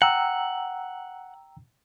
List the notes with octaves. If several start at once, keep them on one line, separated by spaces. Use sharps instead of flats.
F#5 G5 A#5 E6